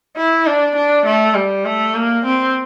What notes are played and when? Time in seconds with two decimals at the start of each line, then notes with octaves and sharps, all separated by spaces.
0.17 E4
0.47 D4
0.76 D4
1.06 A3
1.35 G3
1.65 A3
1.95 A#3
2.25 C4